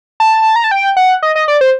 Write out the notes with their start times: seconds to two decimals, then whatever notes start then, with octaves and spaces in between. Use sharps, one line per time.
0.20 A5
0.56 A#5
0.64 A5
0.71 G5
0.97 F#5
1.23 D#5
1.35 D#5
1.48 D5
1.61 C5